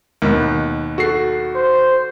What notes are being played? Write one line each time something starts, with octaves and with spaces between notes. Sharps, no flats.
D#2 B2
F#4 A4 C7
C5